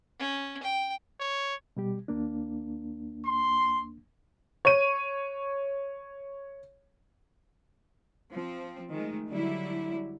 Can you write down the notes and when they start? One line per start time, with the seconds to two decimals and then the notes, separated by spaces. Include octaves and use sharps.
0.19 C#4
0.63 G5
1.20 C#5
1.77 B2 G3 G4
2.08 D#2 A#3 D4
3.26 C6
4.65 C#5 D#7
8.31 F3 C4
8.91 D#3 G#3 A3
9.28 D3 F#3 G3 E4